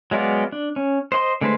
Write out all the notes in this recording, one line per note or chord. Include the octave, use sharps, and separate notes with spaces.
F#3 G#3 B3 D5 F5
D4
C#4
C5 D#5 F#5 C6
D3 G#3 A3 B4 C5